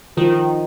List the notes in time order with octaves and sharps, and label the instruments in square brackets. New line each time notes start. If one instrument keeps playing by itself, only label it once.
[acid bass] D#3 [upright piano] F3